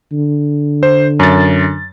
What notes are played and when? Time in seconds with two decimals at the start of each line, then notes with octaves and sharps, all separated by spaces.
0.12 D3
0.83 C5
1.20 F#2 A6